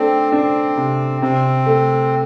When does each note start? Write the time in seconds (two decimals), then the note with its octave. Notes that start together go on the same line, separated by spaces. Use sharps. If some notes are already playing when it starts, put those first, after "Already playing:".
Already playing: A3 C4 D4
0.32 C4 D4
0.77 C3
1.21 C3 C4
1.66 A3